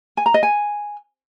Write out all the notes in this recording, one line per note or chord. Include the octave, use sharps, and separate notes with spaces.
G#5
A#5
D#5
G#5